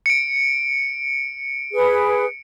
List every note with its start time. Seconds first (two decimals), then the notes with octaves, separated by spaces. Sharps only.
0.06 C#7 D7
1.73 G#4 B4